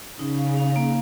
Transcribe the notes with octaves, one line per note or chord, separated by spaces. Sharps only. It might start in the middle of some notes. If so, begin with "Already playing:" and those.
C#3 D#4
F5
F5
A#3